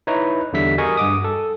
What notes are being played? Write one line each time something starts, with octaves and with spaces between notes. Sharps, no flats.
D#4 E4 B4 C#5 A#5
E2 D3 G3 E5 B6
F#4 G#4 A#4 D#5 G#5 C#6
G2 F#5 D6 D#6
A4